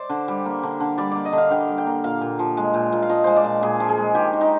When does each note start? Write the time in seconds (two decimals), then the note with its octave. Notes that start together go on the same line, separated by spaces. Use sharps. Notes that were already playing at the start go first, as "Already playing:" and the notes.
Already playing: C5 D5
0.10 D3
0.28 G3
0.45 A#3
0.63 D3
0.80 D3
0.98 G3 D5
1.11 A#3 D5
1.25 D#5
1.33 D3 F5
1.51 D3 G5
1.68 G3
1.78 G5
1.87 A#3
2.04 A#2 F5
2.21 A#2
2.39 F3
2.57 G#3
2.74 A#2
2.92 A#2
3.02 F5
3.09 F3 D#5
3.24 G#3 C5
3.36 D5
3.44 A#2
3.62 A#2 G#4
3.80 F3
3.89 G#4
3.97 G#3
4.15 D#3 G4
4.33 D#3
4.41 D#4